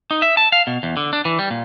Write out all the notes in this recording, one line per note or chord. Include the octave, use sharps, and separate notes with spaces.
D#4
E5
A5
F5
B2
E2
D3
D4
E3
G3
A#2